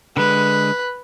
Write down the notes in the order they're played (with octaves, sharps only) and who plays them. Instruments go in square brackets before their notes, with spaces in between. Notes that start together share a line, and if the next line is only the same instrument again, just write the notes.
[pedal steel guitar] D3 G#3 [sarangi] B4